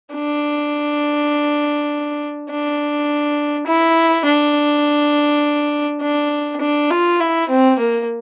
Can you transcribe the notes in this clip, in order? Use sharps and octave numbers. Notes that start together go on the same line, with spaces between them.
D4
D4
E4
D4
D4
D4
F4
E4
C4
A#3